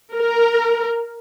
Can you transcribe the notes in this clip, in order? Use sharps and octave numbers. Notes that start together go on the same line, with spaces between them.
A#4